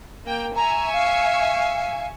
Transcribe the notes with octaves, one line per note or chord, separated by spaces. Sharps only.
A#3 G5
E5 G#5 A#5 C#6
F5